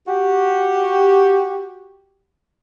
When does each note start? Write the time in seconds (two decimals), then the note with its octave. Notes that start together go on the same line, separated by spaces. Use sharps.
0.07 F#4 G4